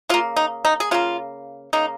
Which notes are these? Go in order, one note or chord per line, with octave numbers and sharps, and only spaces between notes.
C#3 A#3 F4
D#4
D#4
G#4
C#3 A#3 F4
C#3 A#3 D#4